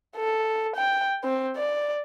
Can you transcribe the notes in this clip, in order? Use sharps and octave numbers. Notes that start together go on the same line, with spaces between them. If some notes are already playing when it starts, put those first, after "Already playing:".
A4
G5
C4
D5